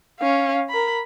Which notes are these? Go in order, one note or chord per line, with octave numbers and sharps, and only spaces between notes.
C#4 F5
A#4 B5